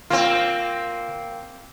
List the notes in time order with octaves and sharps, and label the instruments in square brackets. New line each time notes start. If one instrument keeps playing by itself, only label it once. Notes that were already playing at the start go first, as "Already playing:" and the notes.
[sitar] A#3 C4 [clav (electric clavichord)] F4